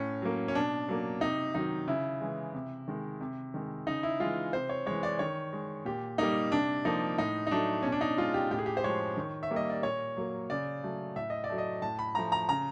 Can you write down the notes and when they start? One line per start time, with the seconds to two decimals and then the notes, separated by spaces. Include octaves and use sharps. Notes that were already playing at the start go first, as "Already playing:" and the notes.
Already playing: A2 C#4
0.22 F#3 A#3
0.48 C#4
0.55 B2 D4
0.88 F#3 A#3
1.21 C3 D#4
1.55 D#3 F#3 D#4
1.87 C#3 E4
2.21 E3 G#3
2.54 C3
2.88 D#3 G#3
3.21 C3
3.54 D#3 G#3
3.87 C#3 D#4
4.03 E4
4.20 E3 G#3 F4
4.53 C3 C5
4.69 C#5
4.86 E3 G#3 C#5
5.03 D5
5.19 D#3 C#5
5.53 G#3
5.85 A#2 G4
6.18 G3 A#3 D#4
6.52 C3 D4
6.85 F3 A#3 D#4
7.18 A2 D#4
7.47 D#4
7.51 F#3 A3 D4
7.83 B2 C#4
7.92 D4
8.01 D#4
8.18 G#3 F4
8.34 G4
8.51 A2 G4
8.58 G#4
8.66 G4
8.77 C5
8.84 F3 G#3 C#5
9.17 D#3
9.43 E5
9.51 G3 A#3
9.56 D#5
9.70 D5
9.83 A#2 C#5
10.17 F#3 A#3
10.50 C#3 D5
10.83 F#3 A3
11.16 A2 E5
11.30 D#5
11.44 D5
11.49 F#3 A3
11.58 D#5
11.82 A2 A5
11.99 B5
12.15 F3 A3 A#5
12.32 A#5
12.49 C#3 A#5